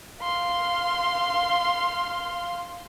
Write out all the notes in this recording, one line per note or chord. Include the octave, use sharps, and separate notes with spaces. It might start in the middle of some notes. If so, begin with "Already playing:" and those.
F5 C6